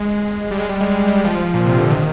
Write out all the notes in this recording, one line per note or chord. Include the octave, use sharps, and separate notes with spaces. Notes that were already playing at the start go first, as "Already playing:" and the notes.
Already playing: G#3
G3
G#3
G3
G#3
G#3
G3
F3
A#2
C3
D3
D#3